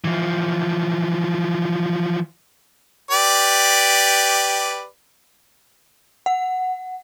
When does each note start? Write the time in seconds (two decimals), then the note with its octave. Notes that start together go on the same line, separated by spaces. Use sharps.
0.05 E3 F3
3.11 G4 B4 D5
6.26 F#5